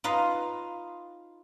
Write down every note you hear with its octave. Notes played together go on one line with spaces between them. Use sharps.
D#4 F4 B4 D#5 F5